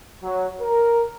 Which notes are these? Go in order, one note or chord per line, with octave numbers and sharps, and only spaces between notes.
F#3
A#4